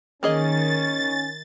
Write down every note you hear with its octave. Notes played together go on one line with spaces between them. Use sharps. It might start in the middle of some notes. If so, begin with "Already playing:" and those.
D#3 A#3 C#4 G#4 D#5 A6